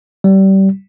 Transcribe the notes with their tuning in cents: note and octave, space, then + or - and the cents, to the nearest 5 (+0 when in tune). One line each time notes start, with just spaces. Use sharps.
G3 -25